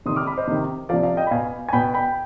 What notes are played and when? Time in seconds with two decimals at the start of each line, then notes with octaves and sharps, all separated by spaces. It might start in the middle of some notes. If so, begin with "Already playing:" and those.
0.06 C3 D#3 C6 D#6
0.16 D6 F6
0.26 B5 D6
0.37 C5 D#5
0.48 C3 D#3
0.89 F3 D5 F5
0.94 C3
1.03 D5 F5
1.17 D#5 G5
1.27 B5
1.31 B2 F5 G#5
1.69 G#5
1.73 B2 G5 B5
1.94 G5 B5